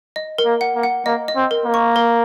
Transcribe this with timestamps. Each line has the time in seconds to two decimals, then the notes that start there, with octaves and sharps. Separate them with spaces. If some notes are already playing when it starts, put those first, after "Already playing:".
0.16 D#5
0.38 A#4
0.46 A#3
0.61 F#5
0.76 A#3
0.83 F#5
1.06 A#3 D#5
1.28 D#5
1.36 C4
1.51 A#4
1.66 A#3
1.74 C#6
1.96 A#4